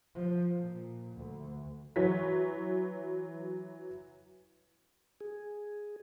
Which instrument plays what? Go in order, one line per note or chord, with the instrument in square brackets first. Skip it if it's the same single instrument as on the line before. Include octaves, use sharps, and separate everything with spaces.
[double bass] F3
A#2
D2
[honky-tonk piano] E3 F#3 C#5 B6
[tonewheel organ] G#4